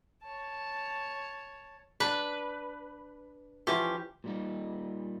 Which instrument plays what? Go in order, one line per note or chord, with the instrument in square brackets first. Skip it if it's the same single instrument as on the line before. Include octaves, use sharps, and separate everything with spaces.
[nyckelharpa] C#5 A5
[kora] D4 [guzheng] B4
[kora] E3 F3 C#4 [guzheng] G4
[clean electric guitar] A#2 G3 D#4